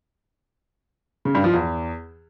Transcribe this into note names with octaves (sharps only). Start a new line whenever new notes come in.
C#3
G2
F3
E2